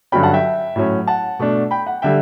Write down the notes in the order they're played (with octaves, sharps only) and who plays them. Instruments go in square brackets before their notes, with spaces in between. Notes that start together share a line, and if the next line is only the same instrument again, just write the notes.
[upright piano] G2 D3 F#3 C#4 G5 B5
F#5 A5
E5 G5
A2 F#3 C#4
F#5 A5
B2 A3 D4
G5 B5
F#5
D3 G3 E5 G5